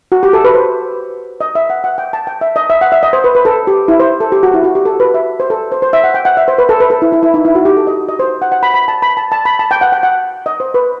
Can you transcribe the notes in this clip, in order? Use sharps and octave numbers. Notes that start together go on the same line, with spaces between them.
F#4
G4
A4
B4
C5
D#5
E5
F#5
F#5
G5
A5
G5
E5
D#5
E5
F#5
E5
D#5
C5
B4
B4
A4
G4
E4
C5
A4
G4
F#4
E4
F#4
G4
A4
B4
E5
C5
A4
C5
C5
E5
F#5
G5
F#5
E5
C5
B4
A4
B4
A4
E4
E4
E4
D#4
E4
F#4
G4
A4
D#5
D#5
C5
F#5
F#5
B5
B5
A5
B5
A5
A5
B5
A5
G5
F#5
G5
F#5
D#5
C5
B4